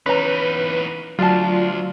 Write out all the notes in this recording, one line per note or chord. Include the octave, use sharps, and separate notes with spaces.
E2 C#4 D#4 B4 A#5
D2 F#3 F4 D5 A5